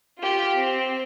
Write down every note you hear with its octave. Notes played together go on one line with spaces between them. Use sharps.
F4 G4
C4